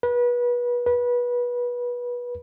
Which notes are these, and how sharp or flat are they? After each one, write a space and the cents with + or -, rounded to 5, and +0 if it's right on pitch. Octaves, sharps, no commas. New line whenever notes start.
B4 -30
B4 -25